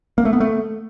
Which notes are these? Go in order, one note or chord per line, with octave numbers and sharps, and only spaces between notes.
A#3
A3
B3
A3